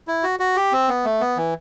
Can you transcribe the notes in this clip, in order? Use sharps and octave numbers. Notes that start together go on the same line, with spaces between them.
E4
F#4
F#4
G4
C4
B3
A3
B3
E3